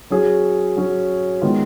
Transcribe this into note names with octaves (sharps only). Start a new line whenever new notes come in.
F#3 C#4 G#4
F#3 C#4 G#4
D#3 G#3 B3 F4